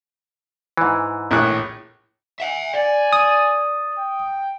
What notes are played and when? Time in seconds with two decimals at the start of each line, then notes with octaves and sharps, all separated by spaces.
0.77 G#2 E3
1.31 A#1 A2 F#6
2.40 E5 F#5
2.74 D5 G#5
3.13 D#6
3.98 G5